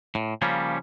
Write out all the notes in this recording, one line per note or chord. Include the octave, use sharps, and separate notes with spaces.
A2
C#3 F3 G3 A#3 C#4